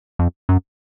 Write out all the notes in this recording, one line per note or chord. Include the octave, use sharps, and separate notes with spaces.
F2
F#2